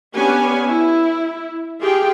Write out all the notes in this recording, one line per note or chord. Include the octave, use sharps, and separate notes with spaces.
B3 C#4 D4 G4 B4 G#5
E4
F4 G4 G#4 G5